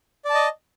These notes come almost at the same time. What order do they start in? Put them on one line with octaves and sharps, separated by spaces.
D5 A5 D#5